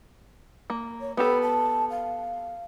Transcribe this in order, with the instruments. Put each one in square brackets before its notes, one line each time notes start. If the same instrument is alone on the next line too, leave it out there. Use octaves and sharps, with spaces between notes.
[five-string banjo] A#3
[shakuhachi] C#5
[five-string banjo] B3 G4 A4 [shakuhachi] B5
[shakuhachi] A5
F5